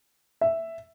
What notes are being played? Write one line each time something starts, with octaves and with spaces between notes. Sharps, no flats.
E5